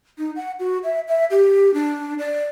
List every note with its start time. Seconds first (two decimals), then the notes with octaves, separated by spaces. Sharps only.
0.18 D#4
0.36 F#5
0.59 F#4
0.84 E5
1.08 E5
1.30 G4
1.74 D4
2.19 D5